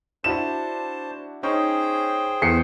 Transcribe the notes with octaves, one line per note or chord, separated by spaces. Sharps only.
D4 E4 F#4 C5 A5 E7
C#4 D#4 G#4 C5 G5 C#6
E2 C7 C#7